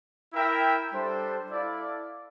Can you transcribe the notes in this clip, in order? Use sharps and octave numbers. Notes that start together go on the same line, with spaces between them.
E4 A#4 E5 G5
G3 D4 A4 C5
E4 A4 D5 F5